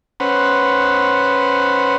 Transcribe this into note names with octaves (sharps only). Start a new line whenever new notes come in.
C#4 B4 C5 F#5